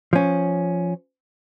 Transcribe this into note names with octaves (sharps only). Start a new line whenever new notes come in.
F3 C#4